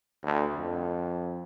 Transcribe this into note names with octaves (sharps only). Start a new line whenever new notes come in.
D2
F2